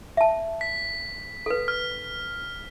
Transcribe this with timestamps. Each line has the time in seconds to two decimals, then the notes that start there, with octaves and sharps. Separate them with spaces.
0.17 E5 A5
0.61 B6
1.46 A4 B4
1.68 F6